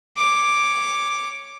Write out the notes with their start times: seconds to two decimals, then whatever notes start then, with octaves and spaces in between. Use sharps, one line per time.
0.17 C#5 D6